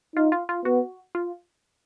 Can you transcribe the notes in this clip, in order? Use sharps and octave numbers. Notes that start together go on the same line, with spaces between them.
D#4 F4
F4
F4
B3 F#4
F4